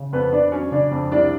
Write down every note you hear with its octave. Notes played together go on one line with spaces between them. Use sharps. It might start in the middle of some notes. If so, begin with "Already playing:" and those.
Already playing: C#3
F2 B3 B4
F2 D4 D5
F#3 C#4 C#5
C#3 D4 D5
F2
C2 D4 D5